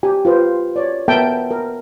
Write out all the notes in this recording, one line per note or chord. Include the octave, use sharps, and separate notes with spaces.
G4 G#5
F4 B4 C5
C#5 D5
B3 A4 A#4 E5 G5 A5
A#4